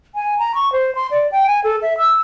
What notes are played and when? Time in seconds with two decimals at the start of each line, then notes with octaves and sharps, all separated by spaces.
0.15 G#5
0.39 A#5
0.55 C#6
0.72 C5
0.95 C6
1.11 D5
1.32 G5
1.47 G#5
1.64 A4
1.82 E5
1.98 E6